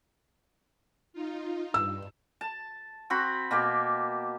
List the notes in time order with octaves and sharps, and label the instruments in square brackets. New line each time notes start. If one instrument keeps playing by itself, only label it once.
[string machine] D#4 F4
[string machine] G2 [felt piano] E6
[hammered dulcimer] A5
C4 F#4 B5
B2 A#3 G4